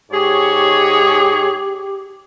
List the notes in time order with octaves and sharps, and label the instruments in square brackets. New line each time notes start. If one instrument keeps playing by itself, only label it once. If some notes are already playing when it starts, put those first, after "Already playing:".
[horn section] G#2 G#4 C#5 [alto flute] G4